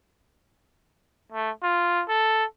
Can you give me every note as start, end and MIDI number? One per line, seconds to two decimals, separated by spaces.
1.32 1.51 57
1.63 2.03 65
2.09 2.44 69